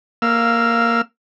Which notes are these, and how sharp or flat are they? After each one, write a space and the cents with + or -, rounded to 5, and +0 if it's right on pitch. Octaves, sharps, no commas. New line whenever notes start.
A#3 +0 F5 -5 E6 +20